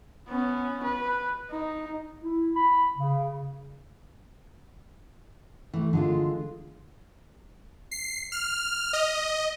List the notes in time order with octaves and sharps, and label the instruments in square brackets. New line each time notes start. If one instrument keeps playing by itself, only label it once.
[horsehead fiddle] B3 C#4
B4
D#4
[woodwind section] E4
B5
C#3
[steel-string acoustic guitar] E3 A3
D3 G#3 F4
[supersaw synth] C7
F6
D#5